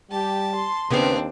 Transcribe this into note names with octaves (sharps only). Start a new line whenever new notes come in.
G3 G4 A5
C6
D#2 C#3 B3 C4 D4 C5